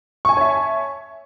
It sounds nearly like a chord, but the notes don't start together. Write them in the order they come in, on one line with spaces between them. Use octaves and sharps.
C#6 G#5 A5 C#5 E5